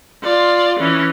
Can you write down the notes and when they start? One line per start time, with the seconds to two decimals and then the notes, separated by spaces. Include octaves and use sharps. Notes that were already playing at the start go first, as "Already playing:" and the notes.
0.23 F4 D5
0.80 E3 C#4